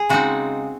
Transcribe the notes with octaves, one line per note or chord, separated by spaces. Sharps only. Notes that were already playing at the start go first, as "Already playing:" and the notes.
Already playing: G#4
C#3 G#3 C4 D#4 F#4